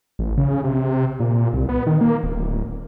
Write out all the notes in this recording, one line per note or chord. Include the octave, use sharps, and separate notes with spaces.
A1
C#3
C3
A#2
C2
B3
D#3
A#3
D1